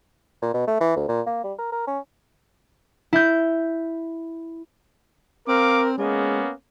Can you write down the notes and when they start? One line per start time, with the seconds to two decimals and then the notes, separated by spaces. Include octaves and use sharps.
0.42 A#2
0.54 B2
0.67 A3
0.81 E3
0.96 D2
1.08 A#2
1.26 A#3
1.44 G3
1.59 A#4
1.72 A#4
1.87 C#4
3.13 E4 G6
5.48 C4 A#4 F5 D6
5.98 G#3 A#3 B3 C#4